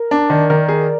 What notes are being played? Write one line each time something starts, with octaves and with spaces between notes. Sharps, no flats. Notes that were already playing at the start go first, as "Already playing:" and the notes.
Already playing: A#4
D4 D5
D#3
D#3 A#4
G#4